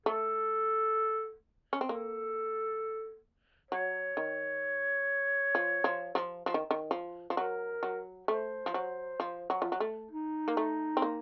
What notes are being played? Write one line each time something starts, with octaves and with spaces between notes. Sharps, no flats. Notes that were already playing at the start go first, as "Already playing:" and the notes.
A3 A4
C#4
C4
A#3 A4
F#3 C#5
D#3
F3
F3
F3
F3
D#3
D#3
F3
F3
F#3 A#4
F#3
A3 C5
F3
F#3
F3
F#3
F3
F#3
A3
D#4
A#3
A3
C4
A#3